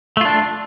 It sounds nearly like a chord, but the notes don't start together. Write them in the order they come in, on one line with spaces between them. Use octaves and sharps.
A3 F4 D4